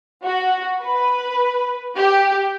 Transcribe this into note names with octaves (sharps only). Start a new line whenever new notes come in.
F#4
B4
G4